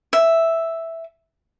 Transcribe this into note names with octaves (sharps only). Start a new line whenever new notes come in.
E5